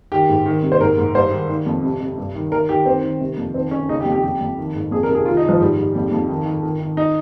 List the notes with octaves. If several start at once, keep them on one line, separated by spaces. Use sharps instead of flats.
D#3 G4
G#2
D#3
C3
C5
G#2 A#4
G#2
G2 C5
D#3
D#3
F2
C3
C3
G2
D#3
D#3 A#4
D#3 G4
D#3 C4
D#3
C3
F2
D#3 C4
D#3 C#4
C#3 D#4
G4
F2
G4
F2 G4
F2
D#3
G#2
F2 G#4
A#4
C3
G#4
D#3 F4
D#4
D#3
F3
G#2 G3
G#2 G3
F2 G3
F2
D#3
D#3
D#3
D#3
D#4